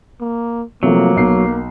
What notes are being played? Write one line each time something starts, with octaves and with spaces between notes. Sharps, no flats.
A#3
C3 F3 F#3 A3 A#3
B1 C7